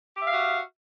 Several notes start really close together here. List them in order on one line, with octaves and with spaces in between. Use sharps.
G4 E5 F5 F#4